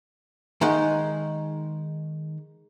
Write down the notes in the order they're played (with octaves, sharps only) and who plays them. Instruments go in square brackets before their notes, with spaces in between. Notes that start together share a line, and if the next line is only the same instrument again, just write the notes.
[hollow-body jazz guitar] D#3 G#3 D#4 F#5